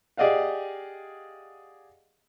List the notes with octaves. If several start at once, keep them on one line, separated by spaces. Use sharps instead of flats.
G4 G#4 D5 D#5 F5 F#5